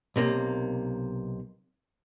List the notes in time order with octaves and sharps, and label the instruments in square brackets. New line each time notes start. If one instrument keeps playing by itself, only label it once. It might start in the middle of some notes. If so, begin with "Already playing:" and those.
[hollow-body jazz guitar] B1 C3 A#3